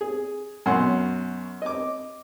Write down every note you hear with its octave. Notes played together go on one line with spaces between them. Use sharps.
G#4
F#2 B2 F#5 C6
D#5 D6